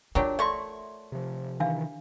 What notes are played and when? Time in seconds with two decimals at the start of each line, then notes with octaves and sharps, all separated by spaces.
0.15 F#3 D4 F4 G4 A#4 C#5 F#5
0.39 A3 D5 E5 C6 C#6
1.12 C3 F3
1.60 C3 D#3 E3 D4 F5